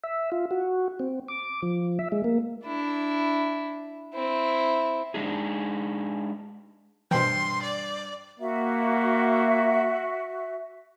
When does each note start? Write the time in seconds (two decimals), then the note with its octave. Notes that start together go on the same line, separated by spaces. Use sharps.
0.04 E5
0.32 F4
0.51 F#4
1.00 C4
1.28 D6
1.63 F3
1.99 E5
2.12 G#3
2.24 A#3
2.66 D4 E4
4.14 C4 E4
5.14 G#3 D4 D#4 G#4
7.11 G2 B2 E3 C5 G5 C6
7.63 D5
8.39 A#3 F#4 E5